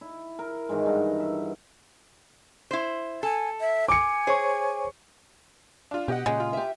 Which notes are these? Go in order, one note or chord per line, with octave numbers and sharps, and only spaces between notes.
E4
A#4
G#2 D#3 E3 G#3
G2 A#4 F#5
E5
E4 C5
A4 G#5
E5
G#5 D6 C#7
G#4 C5 C#5 C#6
D4 F4
B2 G4 D#5 F#5
A#2 C#3 G#3
F4
G4 E5